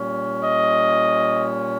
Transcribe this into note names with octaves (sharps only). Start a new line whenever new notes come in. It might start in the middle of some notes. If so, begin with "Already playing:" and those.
Already playing: A#2 G3 C#4
D#5